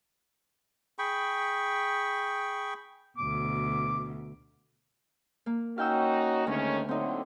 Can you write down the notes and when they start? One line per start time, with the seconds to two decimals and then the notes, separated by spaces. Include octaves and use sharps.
0.99 G#4 G5 B5 C#6
3.18 D2 B2 D6
5.46 A#3
5.78 C#4 D#4 F#4 F5 G5 E6
6.47 D2 D#3 G#3 C#4
6.89 A2 D3 F#3 C4 D#4